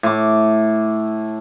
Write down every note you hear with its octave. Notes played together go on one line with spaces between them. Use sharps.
A2 D6